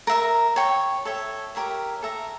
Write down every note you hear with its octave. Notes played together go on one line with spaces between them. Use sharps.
A#4 E5 A#5
C#5 G5 C#6
A4 C#5 E5
G4 A#4 C#5 E5
A4 E5 A#5